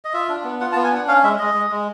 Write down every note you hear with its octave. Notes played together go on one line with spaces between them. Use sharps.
D#5
F4 E5
D4
B3
F4 F#5
A5
B3
G#5
D4 F#5
C#4 F5
G#3 E5
G#3 D#5
G#3
G#3